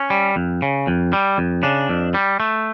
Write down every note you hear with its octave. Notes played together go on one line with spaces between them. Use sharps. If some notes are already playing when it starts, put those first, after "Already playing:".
Already playing: C#4
G3
F2
C#3
F2
G3
F2
C#3 D4
F2
G3
A3